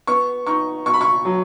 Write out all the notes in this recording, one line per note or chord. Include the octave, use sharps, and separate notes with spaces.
B3 C#6
D#4 C#6
B2 C#6
B5
C#6
F#3